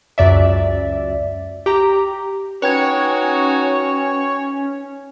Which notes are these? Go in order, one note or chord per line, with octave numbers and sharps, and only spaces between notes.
C#2 F#2 D5 E5
G4 A#5
C#4 D#4 F#4 B4 C#5 G5 G#6